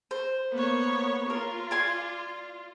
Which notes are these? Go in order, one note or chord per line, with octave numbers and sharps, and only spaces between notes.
C5
A#3 B3 C#5
F4 A#4
D5 G#5 C6